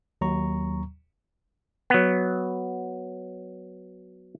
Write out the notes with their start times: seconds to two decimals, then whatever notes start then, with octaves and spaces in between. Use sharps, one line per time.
0.21 D#2 F#3 A#5 C#6
1.90 F#3 B3